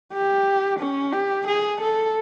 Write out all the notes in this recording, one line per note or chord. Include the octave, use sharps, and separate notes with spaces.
G4
C#4
G4
G#4
A4